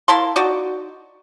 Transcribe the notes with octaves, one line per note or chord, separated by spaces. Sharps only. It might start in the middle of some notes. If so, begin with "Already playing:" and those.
A#3 E4 A5 C6
D#4 F#4 D5